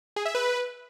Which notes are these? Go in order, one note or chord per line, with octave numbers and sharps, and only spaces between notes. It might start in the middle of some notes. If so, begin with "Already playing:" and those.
G#4
E5
B4